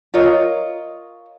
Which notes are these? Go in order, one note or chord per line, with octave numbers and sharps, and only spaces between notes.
F4 A#4 C#5 D#5